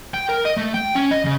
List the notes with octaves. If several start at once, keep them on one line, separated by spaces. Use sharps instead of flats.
G5
A#4
D#5
A3
G5
C#4
D#5
C#3